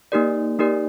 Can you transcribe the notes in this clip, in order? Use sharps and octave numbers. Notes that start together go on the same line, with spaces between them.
A#3 D#4 G4 A#4 D5
A#3 D#4 G4 A#4 D5